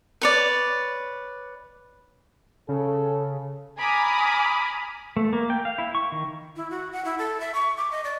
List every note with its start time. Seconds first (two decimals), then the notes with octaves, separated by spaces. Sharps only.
0.21 B4 C#5 D5
2.69 C#3 A4
3.78 G#5 A#5 B5 D6 D#6 F6
5.17 A3
5.33 A#3
5.50 G5
5.65 F5
5.78 E4
5.95 C#6
6.12 D#3
6.56 E4
6.71 F#4
6.93 F#5
7.05 E4
7.19 A4
7.40 E5
7.54 C#6
7.77 D6
7.91 D#5
8.04 D5